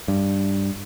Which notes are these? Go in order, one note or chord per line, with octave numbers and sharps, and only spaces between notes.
G2